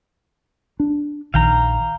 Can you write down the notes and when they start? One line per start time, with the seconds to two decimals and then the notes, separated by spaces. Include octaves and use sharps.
0.80 D4
1.34 A#1 D#3 F5 G5 A#5